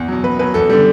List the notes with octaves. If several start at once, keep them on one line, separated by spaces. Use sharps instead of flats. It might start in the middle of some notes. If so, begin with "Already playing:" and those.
Already playing: E2
B2 F#3
E2 B4
B2 F#3 B4
E2 A4
D3 G3